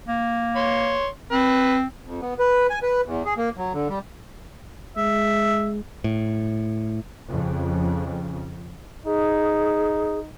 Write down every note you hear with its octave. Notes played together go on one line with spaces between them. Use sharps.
A#3
C#5 C6
C4 B4
F2
B3
B4
G#5
B4
E2
G#4
A#3
F#3
D3
G3
G#3 E5
A2
F2 C#3
D#4 G#4